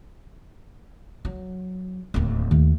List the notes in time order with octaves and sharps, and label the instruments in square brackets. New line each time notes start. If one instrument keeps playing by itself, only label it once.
[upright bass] F#3
D1 D#2
[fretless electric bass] D#2 [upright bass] A3